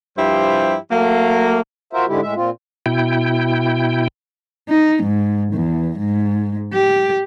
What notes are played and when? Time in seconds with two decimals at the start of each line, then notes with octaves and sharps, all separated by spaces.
0.18 G2 F3 E4 G4 C5
0.91 F#3 A3 A#3
1.93 F4 F#4 A#4 C5 E5
2.08 G#2 D3 G#3 E4 G4
2.22 A2 G#3 E5
2.35 A#2 C4 F4
2.86 B2 E4 G5
4.69 D#4
5.04 G#2
5.53 E2
5.99 G#2
6.73 G4